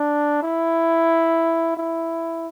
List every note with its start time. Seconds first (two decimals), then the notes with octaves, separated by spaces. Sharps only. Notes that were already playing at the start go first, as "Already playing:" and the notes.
Already playing: D4
0.43 E4
1.77 E4